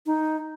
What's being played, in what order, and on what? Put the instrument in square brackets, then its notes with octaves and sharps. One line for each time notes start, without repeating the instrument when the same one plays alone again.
[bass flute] D#4